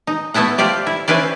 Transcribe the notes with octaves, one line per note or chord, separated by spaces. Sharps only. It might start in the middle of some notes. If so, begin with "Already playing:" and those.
D#4
A3 B3 E4 A4 F#5
F4 G4 C5 D5 E5
E4
C#4 E4 B4 C5 D5